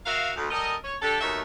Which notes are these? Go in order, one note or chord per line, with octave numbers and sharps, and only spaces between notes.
F#4 A#4 E5 F5
D2
G3 A4 A#4 D#5
C#5
D4 G4 A4
D#2 B2 D#3 A3 C#5 E5